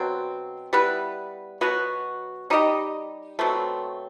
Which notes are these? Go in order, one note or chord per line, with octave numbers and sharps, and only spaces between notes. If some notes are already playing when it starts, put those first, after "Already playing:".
Already playing: B2 F#3 C4
G3 B3 E4 B4
B2 F#3 B3 F#4
G3 D#4 G4 D#5
B2 F#3 A3 C4